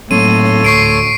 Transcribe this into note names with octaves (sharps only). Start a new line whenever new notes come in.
A2 F#3 A#3 C4 A4 C#5 C6 D#7
D2 C#6 C7 D7